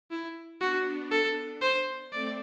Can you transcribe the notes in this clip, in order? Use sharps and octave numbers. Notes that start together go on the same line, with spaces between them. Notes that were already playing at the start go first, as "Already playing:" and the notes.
E4
B3 D4 F#4
A4
C5
A3 C4 D5